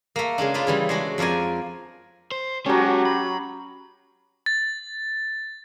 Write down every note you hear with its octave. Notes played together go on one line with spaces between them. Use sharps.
A3 A#3
C#3 G#3 A#3 D4
D4 F4 B4 D5
C#3 E3 G3
G#3 A3 D4 F#4
F2 F3 A#4 D5 G#5
C5
F#3 G#3 C#4 F#4 G4 A4
B5
A6